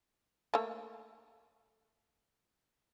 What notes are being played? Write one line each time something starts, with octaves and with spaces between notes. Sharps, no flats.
A3 A#3